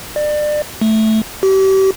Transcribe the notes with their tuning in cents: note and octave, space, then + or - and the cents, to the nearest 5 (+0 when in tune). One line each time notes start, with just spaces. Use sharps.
D5 +30
A3 -5
G4 -35